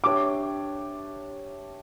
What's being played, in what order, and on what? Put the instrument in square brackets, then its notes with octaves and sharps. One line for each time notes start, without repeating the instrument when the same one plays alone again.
[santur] D4 G4 C#5 E5 [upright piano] D6